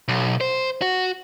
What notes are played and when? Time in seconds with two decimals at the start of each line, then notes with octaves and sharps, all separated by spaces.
0.08 B1
0.41 C5
0.82 F#4